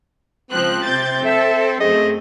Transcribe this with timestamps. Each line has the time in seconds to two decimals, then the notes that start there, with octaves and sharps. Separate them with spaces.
0.51 C#2 F3 C4 F#6
0.84 C3 G6 A6
1.25 A4 E5
1.80 F#2 A3 C4 G#4 D#5